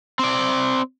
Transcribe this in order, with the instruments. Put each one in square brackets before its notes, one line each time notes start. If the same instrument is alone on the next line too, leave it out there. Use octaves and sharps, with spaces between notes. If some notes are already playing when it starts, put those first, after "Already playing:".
[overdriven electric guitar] C4 D5